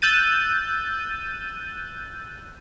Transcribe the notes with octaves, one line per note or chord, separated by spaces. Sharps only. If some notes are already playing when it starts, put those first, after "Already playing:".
E6 F#6 G6 A6 D#7